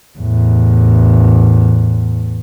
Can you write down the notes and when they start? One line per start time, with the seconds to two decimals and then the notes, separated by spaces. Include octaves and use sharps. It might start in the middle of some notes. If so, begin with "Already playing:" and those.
0.19 E2 A2